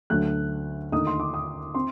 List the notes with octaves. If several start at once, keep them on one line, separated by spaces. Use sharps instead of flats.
D2 D3 F#3 A3 F#6
D#2 D3 A3 D#4 D#6
C6
D6
D#6
C4 C6